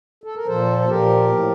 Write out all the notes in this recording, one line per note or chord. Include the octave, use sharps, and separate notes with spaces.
A4
A#4
A#2 F3 A4 C5
C5
A#2 F3 G4 A#4
A2 F3